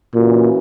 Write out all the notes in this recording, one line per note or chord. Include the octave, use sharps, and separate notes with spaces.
A#2 E3 A#3 C#4 F#4